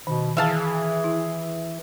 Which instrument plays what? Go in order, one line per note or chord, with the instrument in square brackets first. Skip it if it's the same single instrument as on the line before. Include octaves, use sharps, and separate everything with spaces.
[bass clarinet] B2 [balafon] D#3
[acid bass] E3 [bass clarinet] G#4 [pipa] E5 F5 A5
[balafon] E4